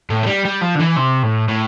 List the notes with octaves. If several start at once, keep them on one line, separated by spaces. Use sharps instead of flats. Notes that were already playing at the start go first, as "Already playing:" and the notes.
A2
A3
G3
G3
F3
D3
E3
C3
A2
A2